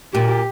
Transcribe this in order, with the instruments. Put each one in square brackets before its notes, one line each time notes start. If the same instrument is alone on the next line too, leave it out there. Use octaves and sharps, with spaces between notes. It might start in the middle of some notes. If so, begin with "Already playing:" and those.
[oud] A#2 [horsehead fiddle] G4